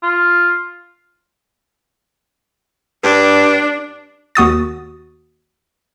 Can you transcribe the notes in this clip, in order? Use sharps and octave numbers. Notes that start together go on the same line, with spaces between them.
F4
G2 D4
D#2 F#4 D#6 A6